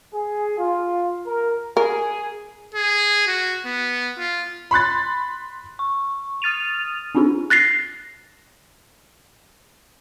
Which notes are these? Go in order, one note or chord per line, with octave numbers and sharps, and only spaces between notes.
G#4
F4
A#4
G#4 A#4
G#4
F#4
B3
F4
B5 C6 F#6 A6
C#6
D#6 F6 A6 D#7 F7
C4 D4 D#4 F4 G#4 A4
F#6 A6 A#6 C7